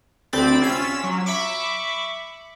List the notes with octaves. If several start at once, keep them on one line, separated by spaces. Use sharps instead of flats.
D2 C3 C4 D5 B5 A6
C#4 F4 E6 B6 E7
F#3
E5 B5 C#6 D6